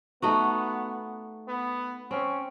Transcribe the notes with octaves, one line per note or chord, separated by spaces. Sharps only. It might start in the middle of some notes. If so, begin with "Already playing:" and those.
A3 B3 D#4 F#4
B3
C4 C#4